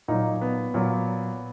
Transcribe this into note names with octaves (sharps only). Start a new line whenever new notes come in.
A#2 F#3 D#4
B3
A#2 F#3